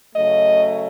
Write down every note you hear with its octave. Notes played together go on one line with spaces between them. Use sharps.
C#3 F#3 A3 D#5